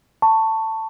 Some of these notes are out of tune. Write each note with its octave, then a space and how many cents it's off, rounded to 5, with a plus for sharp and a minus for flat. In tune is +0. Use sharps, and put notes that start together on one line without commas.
A5 +15 C#6 +0